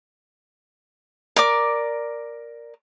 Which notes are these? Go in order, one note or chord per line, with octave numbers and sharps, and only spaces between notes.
A#4 D5 D6